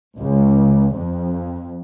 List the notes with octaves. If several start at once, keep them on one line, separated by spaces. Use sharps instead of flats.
C#2
F2